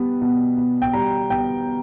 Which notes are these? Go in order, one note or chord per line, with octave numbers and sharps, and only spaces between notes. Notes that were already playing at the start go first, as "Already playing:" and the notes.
Already playing: G3 B3
B2
B2
G5
G3 A#5
B3 G5